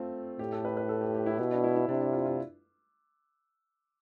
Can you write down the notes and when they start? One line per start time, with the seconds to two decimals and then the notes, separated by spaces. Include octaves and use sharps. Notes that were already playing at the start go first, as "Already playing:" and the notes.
Already playing: A3 C4 F4 A4
0.39 A2 G4
0.52 A4
0.65 B4
0.77 B4
0.89 A4
1.01 G4
1.15 G4
1.26 E4
1.39 B2 E4
1.51 D4
1.64 E4
1.76 E4
1.88 C3 D4
2.01 D4
2.13 F4
2.25 F4